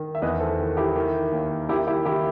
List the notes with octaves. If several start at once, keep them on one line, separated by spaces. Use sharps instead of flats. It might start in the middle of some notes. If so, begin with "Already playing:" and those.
Already playing: D#3
E5
E2 B4 D#5
A4 C5
D#3
E4 G4
D#3
D#2
D#3 E4 G4
E4 G4
D#3 E4 G4